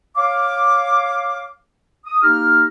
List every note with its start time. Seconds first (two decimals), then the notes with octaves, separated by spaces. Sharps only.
0.17 C#5 F5 D6
2.05 D#6
2.22 A#3 D#4 G4 A#5 F6